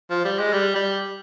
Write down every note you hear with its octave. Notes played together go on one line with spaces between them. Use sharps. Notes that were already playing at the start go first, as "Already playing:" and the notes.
F3
G3
G#3
G3
G3